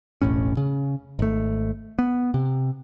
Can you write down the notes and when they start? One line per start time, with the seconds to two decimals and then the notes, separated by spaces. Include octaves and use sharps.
0.22 E1 A1 A2 C#4
0.57 C#3
1.19 G#1 A3
1.99 B3
2.34 C3